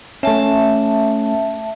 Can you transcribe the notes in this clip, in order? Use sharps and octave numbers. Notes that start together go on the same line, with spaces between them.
A3 C#4 E5 A5